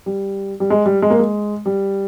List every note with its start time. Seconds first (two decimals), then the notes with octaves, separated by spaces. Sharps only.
0.06 G3
0.60 G3
0.70 G#3
0.86 G3
1.02 G#3
1.10 A#3
1.19 G#3
1.66 G3